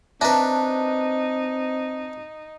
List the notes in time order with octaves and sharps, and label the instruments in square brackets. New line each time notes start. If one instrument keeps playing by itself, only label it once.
[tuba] C4 [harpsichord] D4 B4 [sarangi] D#4 [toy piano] E5 A5 A#5